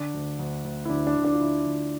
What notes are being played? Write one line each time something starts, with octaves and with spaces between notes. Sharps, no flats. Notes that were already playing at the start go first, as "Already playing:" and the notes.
Already playing: D3 D4
D2
D2
D2
E4
D2 D4
D4
D2
D4
F4
D2 E4
D2